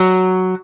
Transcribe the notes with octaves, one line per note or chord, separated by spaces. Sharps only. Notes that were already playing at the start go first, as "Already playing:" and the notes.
Already playing: F#3